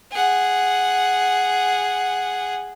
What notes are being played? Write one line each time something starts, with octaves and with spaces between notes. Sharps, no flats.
G#4 F#5